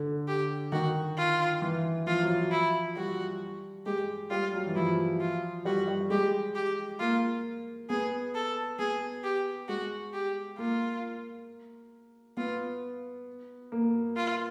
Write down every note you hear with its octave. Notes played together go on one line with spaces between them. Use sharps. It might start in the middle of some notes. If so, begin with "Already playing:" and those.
Already playing: D3
G4
D#3 F#4
F4
E3
F3 F4
F#3
F3
E4
G3 F#4
G#3 G4
G3 F4
F#3
E3
F3 E4
F4
G3 F#4
G3
G#3 G4
G4
A#3 F4
B3 G#4
A4
B3 G#4
G4
G#3 F#4
G4
A#3 F4
B3 F4
A#3
F4